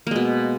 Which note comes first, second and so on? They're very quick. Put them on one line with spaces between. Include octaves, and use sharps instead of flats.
A#3 G#3 B2